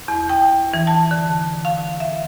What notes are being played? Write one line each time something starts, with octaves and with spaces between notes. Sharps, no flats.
E2
G5
E3
A5
D3
F5
E5